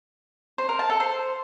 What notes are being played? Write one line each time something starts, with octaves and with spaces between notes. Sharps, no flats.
C5
A#4
A5
A4
C5